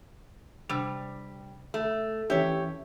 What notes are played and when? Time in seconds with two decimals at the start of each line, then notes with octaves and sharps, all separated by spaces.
0.69 C3 G3 D4
1.74 A3
2.30 E3 C#4 G4 C#5 E5